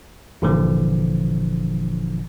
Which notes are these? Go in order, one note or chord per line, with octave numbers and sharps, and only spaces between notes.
G1 A#2 D3 E3 F3